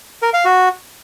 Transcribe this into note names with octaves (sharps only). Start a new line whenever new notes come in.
A#4
F5
F#4